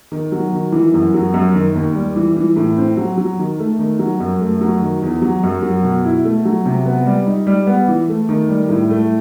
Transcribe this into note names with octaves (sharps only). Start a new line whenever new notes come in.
D#3
F#3
D#3
E3
F#2
F#3
F#2
D#3
D#2
G3
E3
E3
A2
C4
F#3
F#3
D#3
A3
D#3
F#3
F#2
A3
F#3
D#3
E2
F#3
F#2
F#3
B2
E4
A3
F#3
C3
B3
G3
D#4
G3
B3
E3
A3
D#3
G3
A2
A3